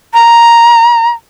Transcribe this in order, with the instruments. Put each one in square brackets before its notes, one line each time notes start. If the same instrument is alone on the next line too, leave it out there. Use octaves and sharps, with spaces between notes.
[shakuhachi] A#5